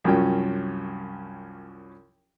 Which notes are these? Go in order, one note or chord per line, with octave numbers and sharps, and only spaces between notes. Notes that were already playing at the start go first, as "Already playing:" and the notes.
C2 F#2 F3 C#4 G5